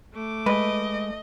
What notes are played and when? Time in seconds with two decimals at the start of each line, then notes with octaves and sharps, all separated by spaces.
0.14 A3 D6
0.46 G#3 B4 D#5